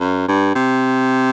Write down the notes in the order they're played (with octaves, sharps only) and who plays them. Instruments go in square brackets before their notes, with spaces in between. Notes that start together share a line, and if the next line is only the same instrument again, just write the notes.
[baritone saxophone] F#2
G2
C3